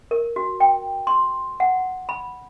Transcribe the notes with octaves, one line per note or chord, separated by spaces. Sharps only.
A#4
F#4
G5
C6
F#5
B5